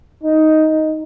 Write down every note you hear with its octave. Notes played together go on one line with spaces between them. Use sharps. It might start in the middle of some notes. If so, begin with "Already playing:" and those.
D#4